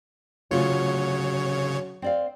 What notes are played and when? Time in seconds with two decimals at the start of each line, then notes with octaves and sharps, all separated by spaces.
0.51 C#3 F#3 A3 F4 C#5
2.02 C4 D5 F5